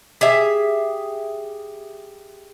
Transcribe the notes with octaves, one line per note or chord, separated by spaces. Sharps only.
G4 G#4 E5